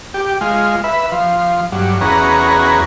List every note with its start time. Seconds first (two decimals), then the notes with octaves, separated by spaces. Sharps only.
0.14 G4
0.41 G#3 F4
0.84 B4 E5
1.12 F3
1.72 G2 F#3
2.01 E2 C#4 F#4 G#4 B4 A#5